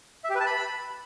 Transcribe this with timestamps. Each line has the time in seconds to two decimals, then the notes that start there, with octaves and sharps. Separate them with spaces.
0.24 E5
0.30 G4
0.35 B4
0.40 A5
0.46 B5